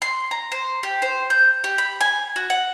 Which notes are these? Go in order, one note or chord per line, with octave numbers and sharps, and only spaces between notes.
C6
A#5
C5
G4
C5
G6
G4
B5
G#5
F#4
F#5